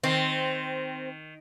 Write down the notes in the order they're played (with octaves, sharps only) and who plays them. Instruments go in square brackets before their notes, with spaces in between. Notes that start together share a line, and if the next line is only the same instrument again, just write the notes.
[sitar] D#3 [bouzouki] C4